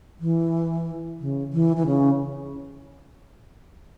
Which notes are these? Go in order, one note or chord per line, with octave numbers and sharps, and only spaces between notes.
E3
C#3
E3
E3
C#3